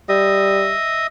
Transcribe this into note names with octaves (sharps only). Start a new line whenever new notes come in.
G3 D#5 E5 D#6